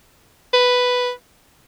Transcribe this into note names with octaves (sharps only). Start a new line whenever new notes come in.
B4